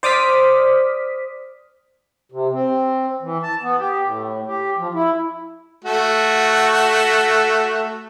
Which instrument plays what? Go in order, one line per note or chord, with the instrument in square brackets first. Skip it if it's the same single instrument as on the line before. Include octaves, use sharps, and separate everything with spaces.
[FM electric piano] C5 D5 D6 D#6 F6 B6
[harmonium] C3
C4
E3
A5
B3
G4
A2
G4
F3
E4
[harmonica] A3 F#4